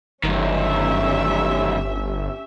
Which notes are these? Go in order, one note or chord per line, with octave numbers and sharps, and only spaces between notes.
G1 F#2 D#3 C#4 G4 E5